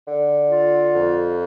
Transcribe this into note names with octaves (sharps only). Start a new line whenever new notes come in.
D3
F4
F2